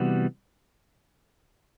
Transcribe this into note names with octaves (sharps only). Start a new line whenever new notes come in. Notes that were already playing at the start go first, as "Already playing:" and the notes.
Already playing: C3 E3 G3 B3 F#4